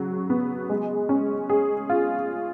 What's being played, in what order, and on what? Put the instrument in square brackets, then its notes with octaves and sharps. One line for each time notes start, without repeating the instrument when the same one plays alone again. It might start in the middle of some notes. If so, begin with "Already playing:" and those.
Already playing: [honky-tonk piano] C#3 F#3 F#4
B3
G#3
C#4
G#4
F4